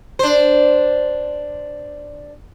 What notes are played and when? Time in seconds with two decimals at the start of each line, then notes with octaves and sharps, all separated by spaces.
0.19 D4 C5